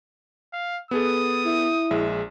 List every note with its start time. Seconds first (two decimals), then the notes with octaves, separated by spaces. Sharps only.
0.54 F5
0.91 B3 G#4 A4 D#6
1.46 E4
1.91 A#1 G#3 E5